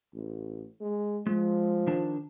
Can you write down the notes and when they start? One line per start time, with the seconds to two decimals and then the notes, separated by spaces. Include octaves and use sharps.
0.14 A1
0.81 G#3
1.27 F3 G#3
1.87 D#3 D4 A5